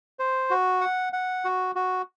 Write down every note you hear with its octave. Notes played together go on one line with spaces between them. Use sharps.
C5
F#4
F#5
F#5
F#4
F#4